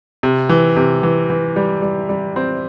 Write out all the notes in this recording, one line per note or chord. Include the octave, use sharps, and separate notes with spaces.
C3
E3
C3
E3
E3
G3
G3
G3
C4